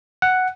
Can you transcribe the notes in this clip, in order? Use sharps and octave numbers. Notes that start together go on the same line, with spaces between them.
F#5